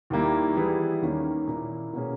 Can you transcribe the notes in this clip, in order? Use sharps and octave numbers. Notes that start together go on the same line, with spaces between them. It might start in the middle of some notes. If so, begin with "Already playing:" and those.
D#2 D#3 G3 A#3 E4
E3 G3 B3 E4 G#4
D#2 D#3 A#3 C#4
A#2 A#3 E4
B2 A#3 C#4 G#4